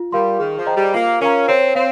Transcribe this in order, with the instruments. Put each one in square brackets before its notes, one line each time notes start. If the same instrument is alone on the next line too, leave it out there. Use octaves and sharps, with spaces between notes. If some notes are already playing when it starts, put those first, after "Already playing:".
Already playing: [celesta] F4
[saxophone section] G3 [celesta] A#4 F5 C6
[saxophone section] D#3 [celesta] G#4
[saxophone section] F3
[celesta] C5 D#5 G5 A#5
[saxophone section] G3
[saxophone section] A#3 [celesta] F4
[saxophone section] C#4 [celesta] A#4 F5 A#5
[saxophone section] C4 [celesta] C#5
[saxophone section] C4 [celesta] F5